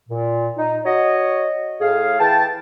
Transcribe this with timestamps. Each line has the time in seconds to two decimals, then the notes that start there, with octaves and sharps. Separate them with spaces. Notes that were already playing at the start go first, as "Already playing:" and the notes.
0.09 A#2
0.57 D#4
0.85 F#4 C#5 D#5
1.81 A2 G#4 F5
2.19 E3 G5 A5